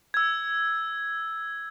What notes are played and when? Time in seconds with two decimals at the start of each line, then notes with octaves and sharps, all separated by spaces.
0.14 E6 G#6